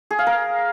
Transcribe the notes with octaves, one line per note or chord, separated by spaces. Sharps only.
G#4
F5
A#4